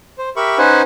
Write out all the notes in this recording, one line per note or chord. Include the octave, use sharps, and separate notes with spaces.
C5
G4 A#4 E5 B5 C#6
C#4 D#4 B4 C5 F#5 G#5